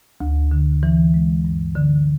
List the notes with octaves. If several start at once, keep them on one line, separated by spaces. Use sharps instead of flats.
D2
D3
E3
G#3
G2
D3